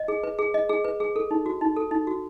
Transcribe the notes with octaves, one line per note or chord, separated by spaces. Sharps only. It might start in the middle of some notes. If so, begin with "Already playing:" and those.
Already playing: D#5
G#4
B4
G#4
D#5
G#4
B4
G#4
A4
D#4
F#4
D#4
A4
D#4
F#4